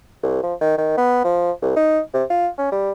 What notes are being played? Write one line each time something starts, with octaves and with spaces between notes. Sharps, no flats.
C2
F3
D#3
D#3
B3
F3
C2
D#4
C3
F4
C#4
G3